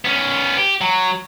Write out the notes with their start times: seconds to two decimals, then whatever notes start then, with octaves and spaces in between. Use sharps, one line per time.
0.05 B3 C#4
0.57 G4
0.81 F#3